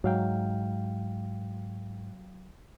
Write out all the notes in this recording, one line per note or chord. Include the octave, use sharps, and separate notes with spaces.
G#2 F#3 F5 G5